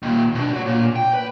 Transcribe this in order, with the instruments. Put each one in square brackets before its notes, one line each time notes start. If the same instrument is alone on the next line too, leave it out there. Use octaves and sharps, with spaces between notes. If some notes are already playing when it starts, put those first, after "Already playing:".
[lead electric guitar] D#2 A#2
B2 D4
F#4 C#5
A#2
G5
B4